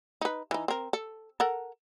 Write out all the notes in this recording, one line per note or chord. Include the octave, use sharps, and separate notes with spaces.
D#4 B4
E3 D#4
C4 A#4
A4
A4 A#4 F#5